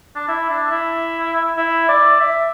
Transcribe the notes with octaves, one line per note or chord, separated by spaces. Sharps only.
D4
E4
D4
E4
E4
D5
E5